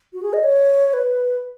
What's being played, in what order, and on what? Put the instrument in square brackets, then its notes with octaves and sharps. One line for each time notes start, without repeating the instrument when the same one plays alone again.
[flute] F#4
G#4
D#5
C#5
B4